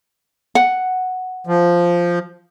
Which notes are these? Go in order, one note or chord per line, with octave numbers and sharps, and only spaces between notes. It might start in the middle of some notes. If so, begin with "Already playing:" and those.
F#5
F3